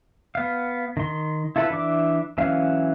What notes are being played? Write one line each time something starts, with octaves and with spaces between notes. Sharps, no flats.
B3 F5
D#3 C6
E4 F4 A4 B4
E3 D4 E5 D6
E3 F#3 C#4 F5